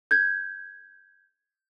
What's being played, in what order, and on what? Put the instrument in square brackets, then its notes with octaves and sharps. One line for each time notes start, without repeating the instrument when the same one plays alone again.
[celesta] G6 G#6